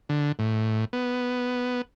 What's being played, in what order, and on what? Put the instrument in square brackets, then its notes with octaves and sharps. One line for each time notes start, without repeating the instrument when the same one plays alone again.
[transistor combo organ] D3
A2
B3